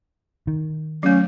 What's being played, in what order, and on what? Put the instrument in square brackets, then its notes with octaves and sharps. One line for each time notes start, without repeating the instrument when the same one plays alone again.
[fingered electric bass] D#3
[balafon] F#3 A3 [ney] C#4